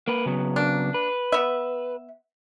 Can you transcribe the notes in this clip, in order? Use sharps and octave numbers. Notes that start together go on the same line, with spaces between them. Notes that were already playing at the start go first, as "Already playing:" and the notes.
A#3 B4
C#3 F#3 B3
A#3 D4
B4
B3 E5